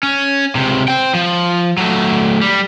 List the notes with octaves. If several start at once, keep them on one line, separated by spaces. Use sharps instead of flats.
C#4
C#2 C3
C5 G5
F3
F#3 A3
G3